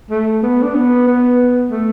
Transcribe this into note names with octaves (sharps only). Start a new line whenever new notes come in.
A3
B3
D4
B3
B3
A3